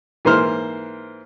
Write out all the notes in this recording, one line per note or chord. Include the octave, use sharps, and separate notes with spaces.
G#2 E3 A#3 C5 F6